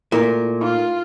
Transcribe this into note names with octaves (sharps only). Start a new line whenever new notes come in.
A#2 A3 E4 A#4
D#4 F4